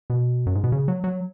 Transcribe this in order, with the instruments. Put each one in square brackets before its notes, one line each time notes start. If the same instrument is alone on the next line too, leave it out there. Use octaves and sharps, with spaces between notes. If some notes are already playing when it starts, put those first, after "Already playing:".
[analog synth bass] B2
F#2
G#2
B2
C#3
F#3
F#3